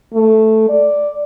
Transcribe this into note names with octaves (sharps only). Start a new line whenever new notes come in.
A3
D5